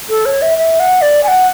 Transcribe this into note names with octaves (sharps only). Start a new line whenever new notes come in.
A4
C#5
E5
E5
F#5
D5
G#5
F#5